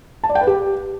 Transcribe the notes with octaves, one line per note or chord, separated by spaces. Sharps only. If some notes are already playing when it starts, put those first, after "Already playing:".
A5
D5
G5
B4
G4